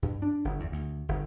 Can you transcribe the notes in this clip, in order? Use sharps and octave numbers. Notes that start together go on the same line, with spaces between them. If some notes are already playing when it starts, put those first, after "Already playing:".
G2
D4
G1
E2
D2
G1